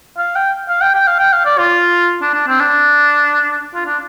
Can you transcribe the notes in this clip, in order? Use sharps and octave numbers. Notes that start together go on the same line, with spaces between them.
F5
G5
F5
G5
G5
F5
G5
F5
D5
F4
D4
D4
C4
D4
F4
D4